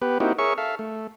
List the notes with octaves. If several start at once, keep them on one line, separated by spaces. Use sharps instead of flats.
B3 G4 B4
A#3 C4 D#4 E4 F#4 G4
G#4 A#4 C#5 E5 C#6
A4 E5 F5
A3